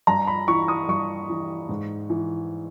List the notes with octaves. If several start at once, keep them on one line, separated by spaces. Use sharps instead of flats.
G2 A#5
B5
E3 C#6
D#6
G2 C#6
E3
G#2
E3